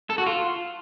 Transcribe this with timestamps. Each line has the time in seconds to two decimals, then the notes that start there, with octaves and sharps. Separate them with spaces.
0.10 A4
0.18 F#4
0.26 F4